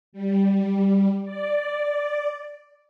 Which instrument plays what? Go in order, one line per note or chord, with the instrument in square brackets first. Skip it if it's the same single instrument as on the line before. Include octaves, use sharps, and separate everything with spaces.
[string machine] G3
D5